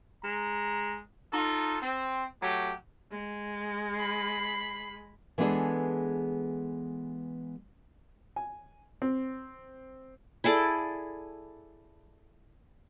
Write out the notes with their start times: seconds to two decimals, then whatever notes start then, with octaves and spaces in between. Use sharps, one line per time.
0.23 G#3 A#5
1.32 D#4 F4 A4
1.82 C4
2.42 F#3 A3 G4
3.11 G#3
3.95 B5 C7
5.38 E3 G#3 B3 D4 G#4 A4
8.36 G#5
9.02 C4
10.44 E4 G#4 A4 D5